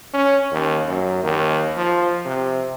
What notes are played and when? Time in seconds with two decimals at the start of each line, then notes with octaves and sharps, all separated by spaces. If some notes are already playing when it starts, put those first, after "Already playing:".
0.14 C#4
0.52 D#2
0.88 F#2
1.23 D#2
1.77 F3
2.25 C3